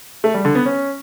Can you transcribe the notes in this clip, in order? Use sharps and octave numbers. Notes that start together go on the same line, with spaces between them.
A3
G3
D3
B3
C#4